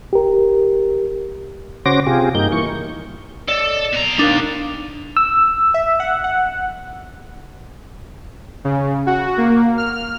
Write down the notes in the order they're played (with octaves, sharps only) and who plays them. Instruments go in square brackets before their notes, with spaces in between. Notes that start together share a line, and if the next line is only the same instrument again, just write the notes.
[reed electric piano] G4 A#4
[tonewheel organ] C#3 C#4 F#4 C5 D6 A#6
C3 F4 G4 G#4
G2 A#3 D#4 G6
E3 A#3 C#6
[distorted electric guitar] A4 [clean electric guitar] D5 D#5
[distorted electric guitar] B2 A#5
[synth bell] D4 [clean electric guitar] D#4 A#4 F5
[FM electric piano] E6
[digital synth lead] E5
F#5
F#5
[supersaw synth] C#3
F#4
A#3
F6